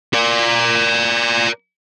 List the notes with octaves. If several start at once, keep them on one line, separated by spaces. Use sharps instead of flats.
A#4 D5